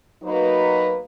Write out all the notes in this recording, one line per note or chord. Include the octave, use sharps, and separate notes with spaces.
F#3 A#3 B3 D#4 F#4 B4